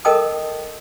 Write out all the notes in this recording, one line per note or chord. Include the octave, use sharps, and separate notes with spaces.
A4 A#4 D#5 G5 A5 D#6